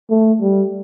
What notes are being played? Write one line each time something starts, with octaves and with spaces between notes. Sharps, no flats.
A3
G3